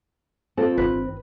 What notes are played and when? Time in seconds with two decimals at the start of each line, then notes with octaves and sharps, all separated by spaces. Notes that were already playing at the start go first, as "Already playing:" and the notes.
0.57 C4 F4 A4
0.78 G1 D#3 B4